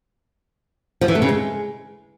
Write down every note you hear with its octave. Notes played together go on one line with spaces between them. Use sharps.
F3
E3
A3
C#3
G#3